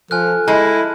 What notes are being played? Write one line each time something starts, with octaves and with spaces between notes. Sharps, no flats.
F3 A4 G#5 F6 F#6
G#3 E4 A5